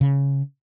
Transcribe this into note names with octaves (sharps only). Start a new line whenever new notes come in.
C#3